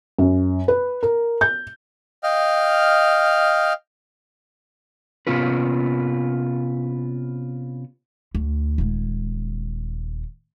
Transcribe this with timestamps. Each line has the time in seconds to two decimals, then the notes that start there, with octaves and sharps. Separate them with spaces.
0.18 F#2
0.68 B4
1.03 A#4
1.41 G6
2.23 D#5 F5 G5 F6
5.27 C3 B3 C#4 F4 B4
8.35 D2
8.78 D#1 G#3